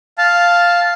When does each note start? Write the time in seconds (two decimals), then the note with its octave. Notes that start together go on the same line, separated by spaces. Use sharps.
0.18 F5 A5